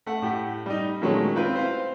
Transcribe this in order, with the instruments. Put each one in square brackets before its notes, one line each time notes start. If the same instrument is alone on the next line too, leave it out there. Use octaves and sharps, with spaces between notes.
[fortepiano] A3 F#5
A2 G4 F#5
G3 D#4
A#2 D#3 F#3 G#3 A3 C#4
C4 E4 F4 B4
C5 F5